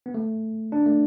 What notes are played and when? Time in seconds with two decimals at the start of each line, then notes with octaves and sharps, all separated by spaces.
0.06 B3
0.14 A3
0.72 D4
0.86 A3